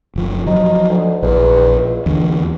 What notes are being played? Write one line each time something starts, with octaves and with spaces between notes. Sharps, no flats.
F#1 F3
F3 F#3 D#4
D2
A#1 E2
C#2
E2 D3